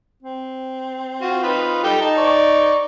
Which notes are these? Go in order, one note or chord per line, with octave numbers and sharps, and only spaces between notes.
C4
F4 F#4
D#4 F4 B4
G3 D#4 A4 G5
D#4 A5
D5 C#6